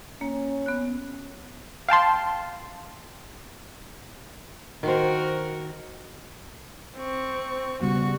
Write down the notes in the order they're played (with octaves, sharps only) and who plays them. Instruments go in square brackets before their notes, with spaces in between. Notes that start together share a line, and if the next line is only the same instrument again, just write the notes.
[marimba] A#3 [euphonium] C#4
[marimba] B3 F#6
[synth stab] F5 G5 A5 C6
[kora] D#3 C5 [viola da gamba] F#4 A#4
[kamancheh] C4 C#6
[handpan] C#3 G3 B3 [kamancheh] F#4 C#6